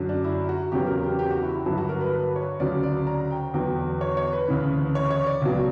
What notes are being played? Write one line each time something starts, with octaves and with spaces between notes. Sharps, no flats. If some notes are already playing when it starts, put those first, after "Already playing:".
Already playing: F#2 D3 F#3
D4
E4
F#4
E2 C#3 F#3 G4
A#4
G4
G4
F#4
E4
E4
G2 D3 F#3 E4
F#4
A#4
B4
B4
C#5
D2 C#3 F#3 D5
D5
A#5
G5
E2 D3 F#3 G5
C#5
C#5
B4
D2 C#3 E3
C#5
C#5
D5
C#2 B2 F#3